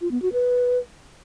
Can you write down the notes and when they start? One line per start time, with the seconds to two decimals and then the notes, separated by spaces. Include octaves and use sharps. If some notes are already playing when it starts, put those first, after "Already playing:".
0.01 F4
0.11 B3
0.22 F#4
0.33 B4